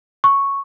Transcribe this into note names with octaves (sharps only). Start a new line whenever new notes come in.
C#6